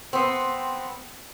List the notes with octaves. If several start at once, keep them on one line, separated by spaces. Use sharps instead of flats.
B3 C4